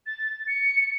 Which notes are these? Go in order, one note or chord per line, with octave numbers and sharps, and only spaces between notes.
A6
C#7